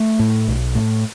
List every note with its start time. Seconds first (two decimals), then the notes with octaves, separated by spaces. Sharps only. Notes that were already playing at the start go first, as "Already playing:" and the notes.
Already playing: A3
0.19 A2
0.48 B1
0.75 A2